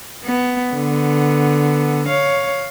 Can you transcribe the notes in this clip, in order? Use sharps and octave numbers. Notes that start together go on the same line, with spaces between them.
B3
D3 B3
C#5 F5